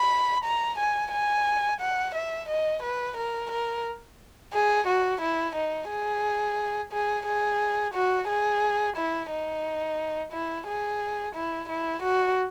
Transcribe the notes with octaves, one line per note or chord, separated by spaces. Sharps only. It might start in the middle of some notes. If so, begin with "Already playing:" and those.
Already playing: B5
A#5
G#5
G#5
F#5
E5
D#5
B4
A#4
A#4
G#4
F#4
E4
D#4
G#4
G#4
G#4
F#4
G#4
E4
D#4
E4
G#4
E4
E4
F#4